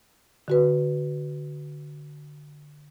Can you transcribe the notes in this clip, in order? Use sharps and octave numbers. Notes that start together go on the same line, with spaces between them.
D3 F#4 B4